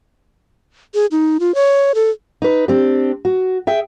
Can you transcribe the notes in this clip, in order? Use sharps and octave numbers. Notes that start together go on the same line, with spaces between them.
G#4
D#4
F4
C#5
A4
D#4 B4
C4 D4 G4
F#4
G#4 E5 G5